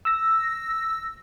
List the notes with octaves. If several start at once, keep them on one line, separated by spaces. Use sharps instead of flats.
E6 A#6